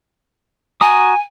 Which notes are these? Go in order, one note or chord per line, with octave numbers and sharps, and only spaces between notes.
F#4 G#5 A#5 D#6